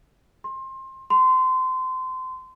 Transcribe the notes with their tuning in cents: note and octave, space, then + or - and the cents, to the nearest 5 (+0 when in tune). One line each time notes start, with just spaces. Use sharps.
C6 +25
C6 -25